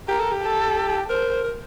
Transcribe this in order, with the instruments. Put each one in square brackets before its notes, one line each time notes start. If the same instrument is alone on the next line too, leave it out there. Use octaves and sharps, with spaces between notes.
[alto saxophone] G4 [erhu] A#4
[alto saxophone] A4
G4
[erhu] A4
[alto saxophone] A#4 [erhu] C5
[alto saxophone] A#4